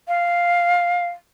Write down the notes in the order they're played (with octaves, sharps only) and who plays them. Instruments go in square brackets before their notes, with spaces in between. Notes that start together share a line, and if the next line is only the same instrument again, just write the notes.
[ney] F5